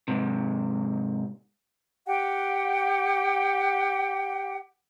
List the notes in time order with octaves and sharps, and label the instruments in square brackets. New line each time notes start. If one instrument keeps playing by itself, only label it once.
[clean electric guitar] G#2 C3
[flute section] G4 F#5 G5